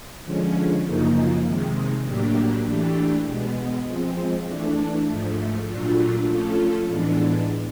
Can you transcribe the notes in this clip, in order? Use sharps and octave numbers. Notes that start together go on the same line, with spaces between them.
D3 F3 G#3 C#4
F#2 C#3 F3 A#3 D#4
C3 D#3 G#3
A2 F#3 A#3 D4 G4
E3 A3 D4 G4
B2 G#3 B3
F3 G#3 C4
E3 A3 D4
G#2 F3 A3
A#2 F#3 A3 D4 F4
F3 A3 C#4 F4 A4
A2 E3 G#3 B3 D4